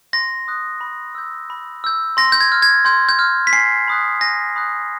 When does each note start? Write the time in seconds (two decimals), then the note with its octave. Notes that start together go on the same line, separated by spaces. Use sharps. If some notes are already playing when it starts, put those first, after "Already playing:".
0.13 C6 A#6
0.48 D#6 F#6
0.81 B5
1.15 E6 G6
1.50 B5
1.84 E6 G6
2.17 C6 A#6
2.32 G6
2.41 G#6
2.52 F6
2.62 G#6
2.85 C6 G6
3.09 G6
3.19 F6
3.47 B6
3.53 G#5 C7
3.88 B5 D#6 F#6
4.21 G#5 A#6
4.56 B5 D#6 F#6